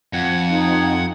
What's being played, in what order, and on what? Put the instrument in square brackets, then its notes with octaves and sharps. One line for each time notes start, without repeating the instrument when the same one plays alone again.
[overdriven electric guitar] F2 [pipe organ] F#5 G#6
[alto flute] D#4